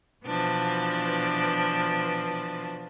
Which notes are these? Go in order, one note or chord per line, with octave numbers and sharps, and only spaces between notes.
B2 E3 F3 D4